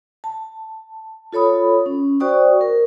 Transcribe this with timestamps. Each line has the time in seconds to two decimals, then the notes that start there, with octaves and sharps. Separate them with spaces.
0.24 A5
1.33 F4 A4 C#5 B5 D#6
1.86 C#4
2.20 F#4 C5 D5 G5 C#6 D#6
2.61 A#4